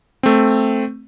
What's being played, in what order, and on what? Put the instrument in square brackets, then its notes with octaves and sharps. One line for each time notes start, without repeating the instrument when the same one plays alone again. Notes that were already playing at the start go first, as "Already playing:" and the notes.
[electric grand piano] A3 C4